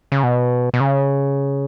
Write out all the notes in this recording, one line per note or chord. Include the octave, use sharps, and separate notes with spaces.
C#3
B2
B2
C#3